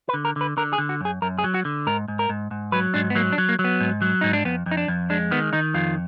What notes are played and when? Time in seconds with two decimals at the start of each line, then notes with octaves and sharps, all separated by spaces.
0.09 B4
0.14 D3
0.25 A#4
0.36 D3 B4
0.57 D3 A#4
0.73 G#4
0.78 D3
0.89 F#4
1.01 F#2 G#4
1.22 F#2 A#4
1.38 G#4
1.44 F#3
1.54 F#4
1.65 D3
1.87 G#2 A#4
2.08 G#2
2.19 A#4
2.30 G#2
2.51 G#2
2.72 F#3 B4
2.94 G#2 D4
3.10 B3
3.15 F#3 A#3
3.32 D4
3.38 F#3
3.49 A#3
3.59 F#3
3.64 B3
3.80 G#2
4.02 F#3
4.21 G#2 D#4
4.33 D4
4.45 F2 B3
4.66 F2
4.71 D#4
4.77 D4
4.88 F2
5.10 G#3 D4
5.31 D#3 B3
5.53 D#3 D#4
5.74 F2 F4